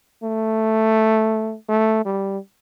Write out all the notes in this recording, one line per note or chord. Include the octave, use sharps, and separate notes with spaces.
A3
A3
G3